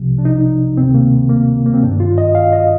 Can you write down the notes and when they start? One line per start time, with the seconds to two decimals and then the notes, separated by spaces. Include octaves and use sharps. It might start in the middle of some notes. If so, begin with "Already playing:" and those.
Already playing: C2 C3 F3
0.18 D4
0.25 D#4
0.77 D2 C3 D#3 C4
0.94 A#3
1.29 A#3
1.66 A#3
1.74 C4
1.83 G2 D#3 D4
2.00 F4
2.18 D#5
2.35 F5
2.53 D#5